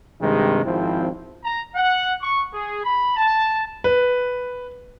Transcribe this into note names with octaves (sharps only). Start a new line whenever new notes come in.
G2 C3 D#3 G#3
G#1 F3 C4 E4
A#5
F#5
C#6
G#4
B5
A5
B4